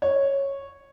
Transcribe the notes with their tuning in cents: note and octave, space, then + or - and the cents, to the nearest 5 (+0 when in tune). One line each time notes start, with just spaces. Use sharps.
C#5 -10